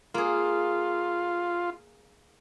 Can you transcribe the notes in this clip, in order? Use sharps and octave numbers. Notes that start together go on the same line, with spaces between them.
A#3 F4 G#4